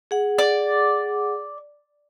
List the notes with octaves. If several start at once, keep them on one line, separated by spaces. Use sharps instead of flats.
G#4 F#5
D5